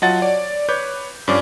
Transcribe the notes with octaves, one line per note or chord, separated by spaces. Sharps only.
F#3 F4 D#5 F#5 A5 A6
C#5 D5
B4 C#5 D6 G6
G2 F3 C#4 D5 D6